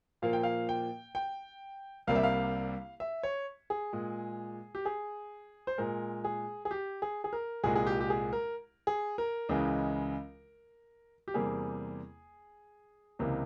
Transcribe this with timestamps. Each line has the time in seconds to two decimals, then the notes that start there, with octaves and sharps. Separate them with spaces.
0.22 A#2 F3 A#3 F5
0.33 G5
0.43 F5
0.69 G5
1.15 G5
2.07 C2 C3 G3 A#3 F5
2.15 E5
2.23 F5
3.00 E5
3.23 C#5
3.70 G#4
3.93 A#2 G#3
4.75 G4
4.85 G#4
5.67 C5
5.78 A#2 G#3 A#4
6.24 G#4
6.65 G#4
6.71 G4
7.02 G#4
7.24 G#4
7.33 A#4
7.63 C2 A#2 G#3 G#4
7.76 G#4
7.87 G4
8.01 G4
8.10 G#4
8.33 A#4
8.87 G#4
9.18 A#4
9.49 C#2 C#3 E3 G#3
11.28 G4
11.34 E2 C3 G3 A#3 G#4
13.19 C#2 C3 E3 A#3